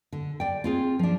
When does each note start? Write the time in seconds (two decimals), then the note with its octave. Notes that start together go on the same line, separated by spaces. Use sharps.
0.12 D3
0.40 D5 G5
0.64 C4 F4 G#4
0.99 F3 D4